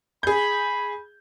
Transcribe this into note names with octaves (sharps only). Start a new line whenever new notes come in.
G#4 B5 G6